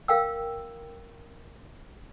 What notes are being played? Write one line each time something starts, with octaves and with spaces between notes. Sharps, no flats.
A#4 F5 G5 E6